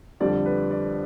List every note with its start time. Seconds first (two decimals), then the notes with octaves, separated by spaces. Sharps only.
0.20 F2 D3 G3 D5
0.46 B4
0.71 D5